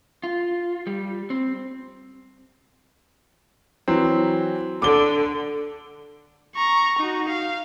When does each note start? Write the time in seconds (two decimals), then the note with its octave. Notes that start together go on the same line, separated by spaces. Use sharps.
0.24 F4
0.87 G3
1.30 C4
3.88 E3 F#3 C4
4.82 D3 D6 G7
6.55 A#5 C#6
6.99 D#4 F#4
7.29 F5